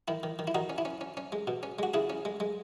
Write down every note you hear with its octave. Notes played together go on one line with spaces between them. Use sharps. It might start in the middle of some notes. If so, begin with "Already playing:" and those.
D#3 E4
D#3
D#3
E4
D#3 D#4 F#4
C#4
E4
C#4
C#4
C#4
G#3
B2
C#4
G#3 F#4
C#3 E4 G#4
C#4
G#3
G#3